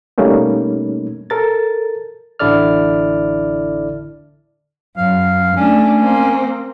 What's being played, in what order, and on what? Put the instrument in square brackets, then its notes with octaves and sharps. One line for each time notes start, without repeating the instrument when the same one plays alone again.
[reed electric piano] B2 G3 A3 A#3 C#4 D#4
A4 A#4 A6
[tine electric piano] A1 D3 E4 A4 D5 F6
[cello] F#2 [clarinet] F5
[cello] A3 D4 [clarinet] C#4
[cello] A#3 C4